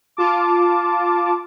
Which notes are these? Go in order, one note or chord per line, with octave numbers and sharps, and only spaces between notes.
F4 A5 D6